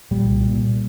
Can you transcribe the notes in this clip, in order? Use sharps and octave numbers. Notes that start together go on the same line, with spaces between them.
A#2 G3
C2
A#2
A#2